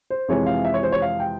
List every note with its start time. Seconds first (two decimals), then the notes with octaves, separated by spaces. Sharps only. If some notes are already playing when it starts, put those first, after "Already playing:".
0.10 C5
0.28 F2 C3 E3 G#3 C#5
0.46 F5
0.65 E5
0.74 C#5
0.83 C5
0.92 C#5
1.02 F5
1.20 G5